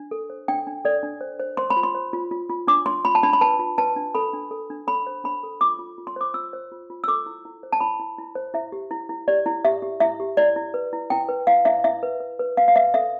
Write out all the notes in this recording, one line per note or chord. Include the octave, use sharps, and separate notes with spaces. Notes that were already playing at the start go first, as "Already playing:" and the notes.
Already playing: D4
A4
C5
D4 G5
D4
A4 D5
D4
C5
C5
C5 C6
B5
F4
C6
C5
F4
F4
F4
D4 D6
D4 C6
F4 B5
A5
D4 B5
B5
B4 A5
F4
B4 A5
D4
A4 B5
D4
A4
D4
A4 B5
C5
D4 B5
A4
F4 D6
F4
F4
C6
C5 D6
F4 E6
C5
F4
F4
E6
A4 D6
E4
E4
C5
A5
E4 B5
E4
E4
C5
E4 E5
G4
E4
E4
G4 D5
E4
G4 E5
G4
E4 E5
G4
E4 D5
E4
B4
E4
E4 G5
B4
E4 F5
E4 E5
E4 E5
B4
B4
B4
B4 F5
F5
B4 E5
A4 E5